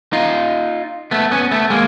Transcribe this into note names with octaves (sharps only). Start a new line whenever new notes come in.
D#4 F4
A3 B3
B3 C#4
A3 B3
G#3 A#3